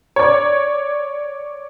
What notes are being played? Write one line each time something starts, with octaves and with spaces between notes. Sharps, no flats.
C#5 D5